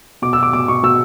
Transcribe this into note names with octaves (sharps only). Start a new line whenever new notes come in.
B2 D6
E6
B2
D6
B2 D6
B2 C#6
B2 E6